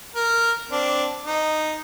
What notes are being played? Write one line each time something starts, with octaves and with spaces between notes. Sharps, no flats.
A#4
C4 D4
D#4